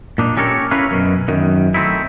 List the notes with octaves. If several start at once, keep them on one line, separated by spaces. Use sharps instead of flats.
A#2 D4 D#4
C#4 G4 A4 A#4 C5 C#5
C#4 E4 A#4 B4 C#5 F5
F#2 B2
F#2 D#3
A3 C4 D#4 E4